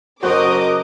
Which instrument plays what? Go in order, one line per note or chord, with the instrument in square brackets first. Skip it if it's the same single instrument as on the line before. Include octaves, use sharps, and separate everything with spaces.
[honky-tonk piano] F#1 C5 F#6 [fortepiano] F#3 C#6 [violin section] A#4 D6 [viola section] D#5